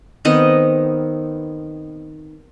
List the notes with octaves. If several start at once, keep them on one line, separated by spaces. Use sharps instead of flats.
D#3 B3 C4 D#5